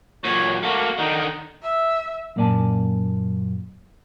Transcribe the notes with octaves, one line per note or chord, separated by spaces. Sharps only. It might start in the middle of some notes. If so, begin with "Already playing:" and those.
A#2 F#3 C#5
A3 A#3 F#4
D3 D#3 D#4
E5
F#2 A#2 A#3 D5 G#5 A5